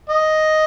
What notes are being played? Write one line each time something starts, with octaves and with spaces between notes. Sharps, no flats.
D#5